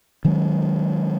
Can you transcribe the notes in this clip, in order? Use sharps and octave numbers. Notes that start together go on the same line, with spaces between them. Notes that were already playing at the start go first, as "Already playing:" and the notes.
D#3 F#3 G#3 C#4